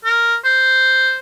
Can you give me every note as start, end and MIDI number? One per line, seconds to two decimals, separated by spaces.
0.05 0.35 70
0.45 1.18 72